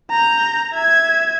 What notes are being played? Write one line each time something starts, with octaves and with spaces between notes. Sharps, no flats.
A#5 G6
E5 G#6